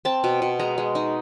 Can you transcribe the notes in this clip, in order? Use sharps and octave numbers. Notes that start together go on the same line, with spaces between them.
C4 A5
B2
B2
G#3 A#5
G#3
D#4